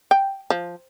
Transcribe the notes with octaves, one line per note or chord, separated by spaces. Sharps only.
G5
F3